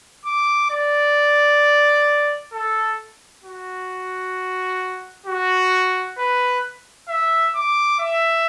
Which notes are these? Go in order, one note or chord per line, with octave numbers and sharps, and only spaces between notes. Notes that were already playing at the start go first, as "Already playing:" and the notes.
D6
D5
A4
F#4
F#4
B4
E5
D6
E5